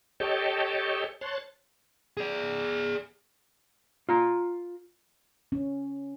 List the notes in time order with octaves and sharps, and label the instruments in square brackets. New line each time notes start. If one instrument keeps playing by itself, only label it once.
[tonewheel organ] G4 A4 C#5 D#5 G5 A5
C#5 A5 C6 F#6 A6
[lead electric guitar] G#4 D5
[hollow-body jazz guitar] F4 A#5
[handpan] C#4